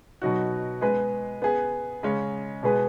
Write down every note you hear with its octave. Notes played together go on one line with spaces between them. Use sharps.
B2 F#3 D#4 F#4
G#3 B3 G#4 B4
B3 G#4 B4
C#3 G#3 C#4
B2 G#3 B3 G#4 B4